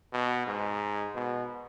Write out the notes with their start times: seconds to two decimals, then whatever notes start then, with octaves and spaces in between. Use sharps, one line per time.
0.13 B2
0.47 G#2
1.15 B2